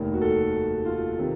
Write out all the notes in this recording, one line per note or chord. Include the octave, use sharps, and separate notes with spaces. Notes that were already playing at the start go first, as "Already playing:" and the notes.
Already playing: F1 D#2 D#3
F#4
A4
F4
C3 D#3